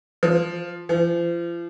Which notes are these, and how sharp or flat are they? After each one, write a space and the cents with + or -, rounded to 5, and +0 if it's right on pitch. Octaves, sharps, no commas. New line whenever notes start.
F3 +0
F3 -35